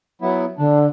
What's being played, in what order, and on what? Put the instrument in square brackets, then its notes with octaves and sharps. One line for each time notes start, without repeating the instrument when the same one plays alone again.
[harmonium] F#3 B3 E4
[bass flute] D3 [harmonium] D4